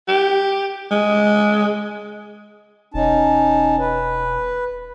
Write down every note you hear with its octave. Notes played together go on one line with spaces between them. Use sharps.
G4
G#3
E1 C#4 D#4 A5
B4